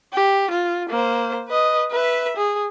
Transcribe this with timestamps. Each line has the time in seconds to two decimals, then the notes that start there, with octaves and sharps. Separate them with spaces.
0.14 G4
0.51 F4
0.90 A#3 C5
1.48 B4 D#5
1.92 B4 E5
2.37 G#4